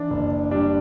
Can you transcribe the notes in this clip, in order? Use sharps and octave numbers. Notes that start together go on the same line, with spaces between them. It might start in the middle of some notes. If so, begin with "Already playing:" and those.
Already playing: E3 D4
F#1
G3 D4